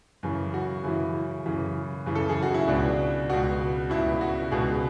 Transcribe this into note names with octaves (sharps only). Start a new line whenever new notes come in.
F#2 C#3 E3
F#4
F#2 C#3 E3 E4
F#2 C#3 E3
F#2 C#3 E3
A4
G#4
F#4
E4
C#2 B2 D4
C#2 B2 F#4
C#2 B2 E4
F#4
C#2 B2 G#4